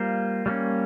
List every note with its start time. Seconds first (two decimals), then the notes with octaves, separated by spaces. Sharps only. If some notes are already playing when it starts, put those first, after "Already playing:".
Already playing: G3 A#3 F4 C5
0.46 G3 A#3 C#4